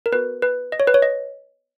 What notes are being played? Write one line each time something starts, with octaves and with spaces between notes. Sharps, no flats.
A#4
B3 F#4 B4
B4
D#5
C#5
B4
C#5
D#5